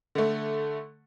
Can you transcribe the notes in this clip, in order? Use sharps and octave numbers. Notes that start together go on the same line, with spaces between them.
D3 A3